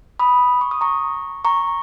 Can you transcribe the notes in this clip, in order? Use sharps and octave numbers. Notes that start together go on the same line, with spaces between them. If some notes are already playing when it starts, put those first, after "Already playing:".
B5 D#6
C#6
D#6
A#5 C#6
A#5 C#6